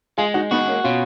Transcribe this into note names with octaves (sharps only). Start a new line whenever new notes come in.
G#3 F4 G#4
D#4 F#4
B3 D#4 F#4
A#3 C#4
B2 C#4 F4